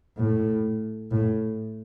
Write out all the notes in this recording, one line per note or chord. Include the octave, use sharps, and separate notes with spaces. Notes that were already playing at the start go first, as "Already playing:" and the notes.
A2
A2